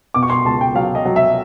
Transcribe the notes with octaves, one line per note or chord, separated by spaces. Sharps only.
B2 D6
C#6
C6
C#2 A5
G5
F#3 F5
D#5
F#3
E5